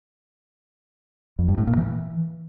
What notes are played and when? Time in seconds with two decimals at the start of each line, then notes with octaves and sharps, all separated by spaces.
1.39 F2
1.48 G2
1.58 A2
1.67 A#2
1.77 E3